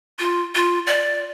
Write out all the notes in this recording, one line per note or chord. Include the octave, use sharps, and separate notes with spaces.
F4
F4
D5